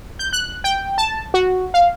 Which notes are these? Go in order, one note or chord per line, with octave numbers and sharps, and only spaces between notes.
G6
F#6
G5
A5
F#4
F5